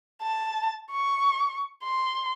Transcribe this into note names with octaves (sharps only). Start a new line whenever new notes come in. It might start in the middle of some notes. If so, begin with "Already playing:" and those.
A5
C#6
C6